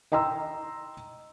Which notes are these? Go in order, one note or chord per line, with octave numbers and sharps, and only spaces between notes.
D#5 G5 A#5 C6 E6